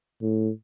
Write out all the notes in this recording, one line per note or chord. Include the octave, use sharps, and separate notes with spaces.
A2